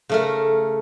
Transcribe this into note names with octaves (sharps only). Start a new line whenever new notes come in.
C#3 A3 A#4